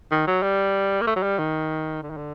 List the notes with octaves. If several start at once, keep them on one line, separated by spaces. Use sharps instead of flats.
D#3
F#3
G3
A#3
A3
F#3
G3
D#3
D3
D#3
D3